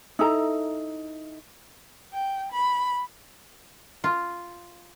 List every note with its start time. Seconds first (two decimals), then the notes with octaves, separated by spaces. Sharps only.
0.19 D#4 E4 A4 A#5
2.13 G5
2.53 B5
4.04 F4